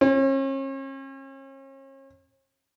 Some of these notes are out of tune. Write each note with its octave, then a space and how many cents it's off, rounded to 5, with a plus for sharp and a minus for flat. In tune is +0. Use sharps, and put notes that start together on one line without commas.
C#4 -40